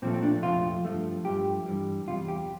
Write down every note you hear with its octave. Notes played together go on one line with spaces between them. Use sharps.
A#2 F3 A3 C4
C4
D4
F2 C3 F3 A3 F4
G2 F3 A3
G2 F3 A3 G4
G2 E3 G3
E2 C3 G3 F4
G4